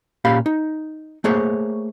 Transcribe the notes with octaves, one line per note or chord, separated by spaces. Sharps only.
A#2 C#4 G4 F5 B5
D#4
A3 A#3 G#4 C5 C#5